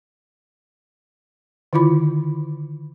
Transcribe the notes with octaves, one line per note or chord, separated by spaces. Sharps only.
D3 D#3 E4 F4 B5